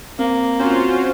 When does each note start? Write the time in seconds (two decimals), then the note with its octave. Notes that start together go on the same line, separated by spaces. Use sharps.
0.19 A#3 C4
0.59 C#4 F4 F#4 C5